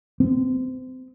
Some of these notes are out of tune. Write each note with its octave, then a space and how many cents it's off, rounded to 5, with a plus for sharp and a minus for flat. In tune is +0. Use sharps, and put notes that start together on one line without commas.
C4 -30